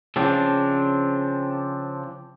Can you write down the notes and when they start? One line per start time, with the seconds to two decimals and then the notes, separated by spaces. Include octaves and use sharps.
0.16 C#3 F3 C4 D4